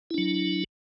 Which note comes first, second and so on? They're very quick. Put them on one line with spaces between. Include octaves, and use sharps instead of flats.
E4 D4 F#3